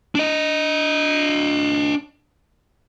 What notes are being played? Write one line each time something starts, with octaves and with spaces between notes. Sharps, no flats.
D4 D#5